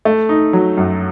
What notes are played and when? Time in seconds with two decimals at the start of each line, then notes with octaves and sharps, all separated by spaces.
0.05 A3
0.29 D#4
0.53 F#3
0.77 F#2